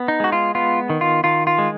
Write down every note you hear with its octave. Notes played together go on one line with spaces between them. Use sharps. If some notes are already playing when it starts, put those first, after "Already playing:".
Already playing: B3
D#4
G#3 F#4
F4
B3 F4
D#3
F4
D#3 F4
F4
G#3